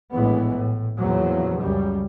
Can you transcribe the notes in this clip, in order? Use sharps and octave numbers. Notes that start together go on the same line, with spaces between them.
A#1 A2 E3 G#3 B3
A2
E2 A#2 C#3 F3 F#3
C#2 F#2 C#3 G3